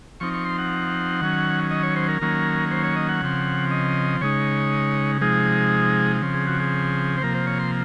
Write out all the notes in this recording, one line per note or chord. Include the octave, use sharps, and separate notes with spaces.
F3 C4 D#4 C#6
C#6
C6
F#5
D#3 F#3 C#4
D#5
C#5
C5
A#4
D#3 F#3 A#3 C#4
C5
C#5
D#5
F#5
C#3 F3 C4
D#5
C#3 G#3 D#4 C#5
C3 F3 G#3 D#4 G#4
C#3 F3 C4
G#4
F#4
G#4
C5
C3 F3 A#3 A#4
C5
C#5
C6